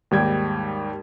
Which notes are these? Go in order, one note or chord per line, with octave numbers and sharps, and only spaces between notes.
D#2 G#2 G3 G5 G#6